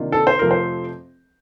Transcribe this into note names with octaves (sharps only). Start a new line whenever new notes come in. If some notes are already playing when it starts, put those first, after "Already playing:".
Already playing: C3 D#3 A#3 D4 F4
A4
C5
F2 C3 F3 A3 C4 A#4
C5